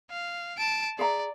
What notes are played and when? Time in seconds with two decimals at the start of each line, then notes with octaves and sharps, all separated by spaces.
0.11 F5
0.58 A5 D7
0.99 G#4 D5 E5 A#5